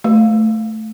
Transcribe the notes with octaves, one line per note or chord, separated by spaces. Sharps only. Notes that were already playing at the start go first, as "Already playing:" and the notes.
A3